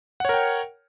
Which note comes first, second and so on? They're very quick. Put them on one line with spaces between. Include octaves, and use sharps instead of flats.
F#5 C#5 A#4 G5